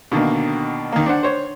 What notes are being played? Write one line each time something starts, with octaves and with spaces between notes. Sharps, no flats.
B2 D3 D#3 A#3
D#3 A#3
D4 C5 F#5
C5 C#5